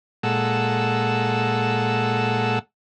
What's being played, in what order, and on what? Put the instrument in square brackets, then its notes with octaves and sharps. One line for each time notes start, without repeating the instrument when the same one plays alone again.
[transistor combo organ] A#2 G#3 A4 F#5 E6